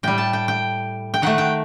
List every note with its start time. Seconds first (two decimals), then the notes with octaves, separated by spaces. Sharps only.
0.03 A2 G3 G5
0.18 A5
0.33 G5
0.48 G5
1.14 G5
1.22 D#3 A3 F#5
1.38 G5